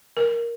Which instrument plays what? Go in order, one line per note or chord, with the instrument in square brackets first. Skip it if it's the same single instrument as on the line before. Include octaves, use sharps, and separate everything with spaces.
[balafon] A#4